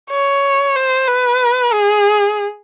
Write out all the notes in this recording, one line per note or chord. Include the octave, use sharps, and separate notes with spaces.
C#5
C5
B4
G#4